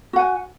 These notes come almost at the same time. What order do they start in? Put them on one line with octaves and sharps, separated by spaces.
F#4 F#5 G#5